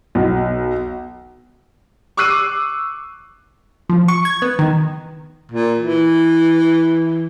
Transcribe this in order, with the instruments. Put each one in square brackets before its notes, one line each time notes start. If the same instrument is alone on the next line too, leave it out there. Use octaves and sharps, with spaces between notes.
[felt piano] B1
[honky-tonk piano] C#6 D6 E6 F#6 C7 D#7
[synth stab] F3
C#6
G#6
B3
D#3
[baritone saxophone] A#2
E3